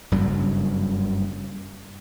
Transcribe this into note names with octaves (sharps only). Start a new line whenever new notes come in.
F#1 G2 C#3 F#3